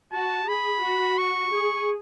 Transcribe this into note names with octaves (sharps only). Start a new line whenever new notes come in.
F#4 A5
G#4 B5
F#4
C#6
G#4